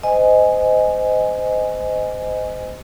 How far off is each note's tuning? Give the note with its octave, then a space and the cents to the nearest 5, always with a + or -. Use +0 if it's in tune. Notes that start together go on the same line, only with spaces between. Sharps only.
C5 -30 D#5 +0 G#5 +5